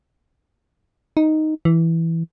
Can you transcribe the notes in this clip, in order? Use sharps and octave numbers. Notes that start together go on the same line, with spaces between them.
D#4
E3